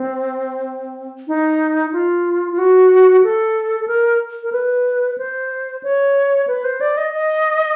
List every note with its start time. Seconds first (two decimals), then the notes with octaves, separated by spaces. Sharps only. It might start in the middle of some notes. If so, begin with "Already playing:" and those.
Already playing: C4
1.28 D#4
1.93 F4
2.52 F4
2.58 F#4
3.23 A4
3.80 A4
3.88 A#4
4.43 A#4
4.52 B4
5.18 C5
5.83 C#5
6.47 B4
6.64 C5
6.81 D5
6.97 D#5
7.13 D#5